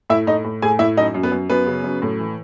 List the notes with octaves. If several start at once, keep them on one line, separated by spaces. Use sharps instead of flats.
A2 E4 E5
A2 D#4 D#5
A2
A2 G#4 G#5
A2 E4 E5
F#2 D#4 D#5
F#2
B3 B4
F#2
F#2 B3 B4
C#3
F#2
A2
E3